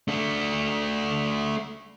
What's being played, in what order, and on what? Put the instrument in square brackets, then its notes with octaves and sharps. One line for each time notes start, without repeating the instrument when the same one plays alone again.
[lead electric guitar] A3 D4